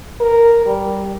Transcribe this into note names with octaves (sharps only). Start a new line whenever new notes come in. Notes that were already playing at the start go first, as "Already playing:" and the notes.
A#4
G3